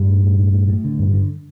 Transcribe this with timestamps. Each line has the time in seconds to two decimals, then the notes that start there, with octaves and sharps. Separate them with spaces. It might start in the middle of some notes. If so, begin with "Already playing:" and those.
Already playing: G2 G3
0.08 A2
0.23 A2
0.39 A2
0.53 A2
0.69 A2
0.84 D3
0.99 G2
1.13 D3